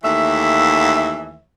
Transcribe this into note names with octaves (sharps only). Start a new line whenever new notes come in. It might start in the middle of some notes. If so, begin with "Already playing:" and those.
D#2 E3 A3 E5